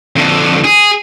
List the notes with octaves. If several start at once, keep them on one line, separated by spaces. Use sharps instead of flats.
F2 D3
G#4